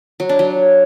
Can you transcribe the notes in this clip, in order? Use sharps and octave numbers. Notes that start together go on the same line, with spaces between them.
F#3
D4
F#3